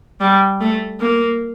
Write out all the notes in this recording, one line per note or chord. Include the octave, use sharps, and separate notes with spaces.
G3
A3
A#3